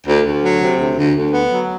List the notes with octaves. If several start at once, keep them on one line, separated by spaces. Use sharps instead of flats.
D2
D2
F#3
C3
D2
D2
D2
B3
F#3